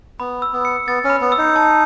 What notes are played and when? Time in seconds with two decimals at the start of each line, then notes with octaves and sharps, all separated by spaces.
0.20 B3 B5
0.42 E6
0.53 B3
0.65 C#7
0.87 B3 A6
1.04 C#4
1.10 B5
1.21 B3
1.32 E6
1.38 D#4
1.56 A5